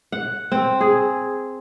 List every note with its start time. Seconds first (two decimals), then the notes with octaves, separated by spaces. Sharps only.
0.12 F#5
0.52 C4
0.81 G#4